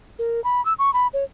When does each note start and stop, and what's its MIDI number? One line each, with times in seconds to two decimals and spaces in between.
0.19 0.43 70
0.44 0.64 83
0.65 0.74 88
0.79 0.93 85
0.94 1.07 83
1.13 1.24 73